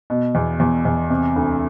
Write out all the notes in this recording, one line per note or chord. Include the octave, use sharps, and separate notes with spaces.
B2
E2
E2
E2
C3
D2